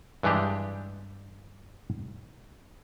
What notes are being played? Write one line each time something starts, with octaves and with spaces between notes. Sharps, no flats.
G2 E3 G#3 D4 G4